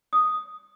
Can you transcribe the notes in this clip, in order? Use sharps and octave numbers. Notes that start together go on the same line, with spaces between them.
D#6